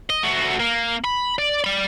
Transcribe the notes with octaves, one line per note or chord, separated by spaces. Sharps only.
D#5
A3 F#4
A#3
B5
D5
D5 B5